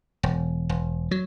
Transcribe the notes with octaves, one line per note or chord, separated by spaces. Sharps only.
E1
E1
F#3